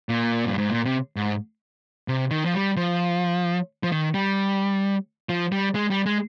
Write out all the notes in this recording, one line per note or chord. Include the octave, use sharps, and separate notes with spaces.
A#2
G2
G#2
A#2
C3
G#2
C3
D#3
F3
G3
F3
F3
D#3
G3
F3
G3
G#3
G3
G#3